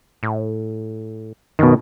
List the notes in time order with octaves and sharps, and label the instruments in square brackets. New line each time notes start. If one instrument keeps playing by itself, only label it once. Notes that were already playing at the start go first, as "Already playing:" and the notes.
[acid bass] A2
[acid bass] F#2 [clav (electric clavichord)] B2 D#3